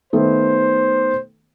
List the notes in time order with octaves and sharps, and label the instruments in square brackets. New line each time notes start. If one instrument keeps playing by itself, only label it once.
[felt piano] D#3 A3 B3 [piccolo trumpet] C5